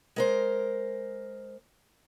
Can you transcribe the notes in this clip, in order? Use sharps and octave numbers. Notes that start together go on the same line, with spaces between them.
G#3 A#4 C5